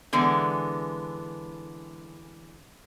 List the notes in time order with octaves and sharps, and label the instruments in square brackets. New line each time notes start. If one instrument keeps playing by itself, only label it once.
[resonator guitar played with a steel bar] D3 E3 G#3 B3